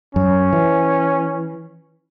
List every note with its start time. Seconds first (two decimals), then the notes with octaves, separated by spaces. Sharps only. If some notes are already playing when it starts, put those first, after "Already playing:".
0.15 F#2 C#4
0.53 E3